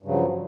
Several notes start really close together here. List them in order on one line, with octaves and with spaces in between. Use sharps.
G2 C#3 F#3 F3